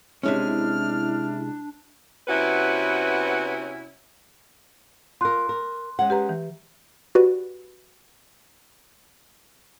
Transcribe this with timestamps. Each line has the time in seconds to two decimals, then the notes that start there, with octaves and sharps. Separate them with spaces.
0.23 C3 G#3 C#4 D4 E4 F6
2.28 C3 B3 C#4 E4 F#4 B4
5.21 F4 A#4 C6 F#6
5.49 A#4
5.99 G#3 C#4 F#5
6.10 G4 B4 A#5
6.29 E3
7.15 F#4 G4 B4 D5